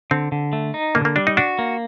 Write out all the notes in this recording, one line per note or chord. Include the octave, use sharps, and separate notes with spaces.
D3 C4
D3
A3
D#4
D3 A#3
A#3
G3 D4
D#4
D4 F#4
A#3